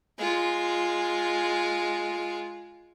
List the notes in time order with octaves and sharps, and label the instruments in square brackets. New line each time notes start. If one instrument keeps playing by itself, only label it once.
[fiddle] G#3 F4